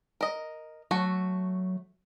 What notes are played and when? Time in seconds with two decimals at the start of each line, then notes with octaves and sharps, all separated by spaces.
0.21 A#4 D#5
0.91 F#3 A3 F#4